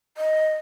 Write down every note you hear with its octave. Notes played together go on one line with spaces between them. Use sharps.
D#5